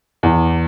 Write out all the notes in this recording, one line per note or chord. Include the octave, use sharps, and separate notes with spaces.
E2